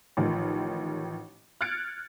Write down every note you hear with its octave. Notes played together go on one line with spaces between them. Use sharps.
A1 D#3 F3
F6 F#6 G#6 A6 C#7 D7